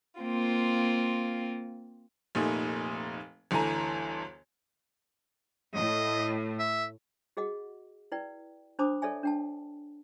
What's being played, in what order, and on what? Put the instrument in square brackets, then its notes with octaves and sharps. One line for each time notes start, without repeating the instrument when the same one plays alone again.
[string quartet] A#3 C4 F4
[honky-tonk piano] F1 A#2 A3 D#4 G#5
G1 D2 E3 A4 G#5 A#5
[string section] A2 [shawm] D#5
[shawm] E5
[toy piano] F#4 G#4 D#5 F#5
E4 B4 D5 G5
D4 C5 A5 B5 D6 D#6
A4 C#5 D5 E5 G#5
D4 G5 A5